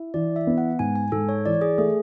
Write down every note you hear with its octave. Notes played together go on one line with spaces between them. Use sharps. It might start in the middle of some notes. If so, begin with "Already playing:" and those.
Already playing: E4
E3 D5
E5
B3
F#5
G#2 G#5
G#5
G#2 A4
C#5
E3 D5
G#4
A3 G#4